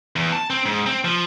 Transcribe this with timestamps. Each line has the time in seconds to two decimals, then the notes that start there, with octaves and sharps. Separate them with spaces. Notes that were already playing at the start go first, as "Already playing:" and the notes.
0.16 E2
0.33 A5
0.50 C4
0.66 G#2
0.86 C4
1.05 F3